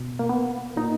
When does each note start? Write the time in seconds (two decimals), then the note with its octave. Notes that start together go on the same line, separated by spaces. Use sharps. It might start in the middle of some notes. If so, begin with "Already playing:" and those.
Already playing: B2
0.19 A#3
0.29 B3
0.77 A#2 D#4